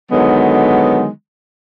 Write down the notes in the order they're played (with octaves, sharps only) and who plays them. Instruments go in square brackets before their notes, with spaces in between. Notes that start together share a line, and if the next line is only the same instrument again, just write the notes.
[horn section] D3 D#3 F#3 G#3 B3